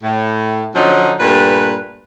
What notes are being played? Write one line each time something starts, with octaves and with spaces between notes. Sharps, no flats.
A2
D3 F3 F#3 C#4 D#4
G2 A#2 A3 B4